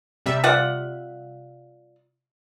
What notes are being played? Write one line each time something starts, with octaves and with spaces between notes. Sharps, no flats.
C3 G3 E5
F4 D5 F#5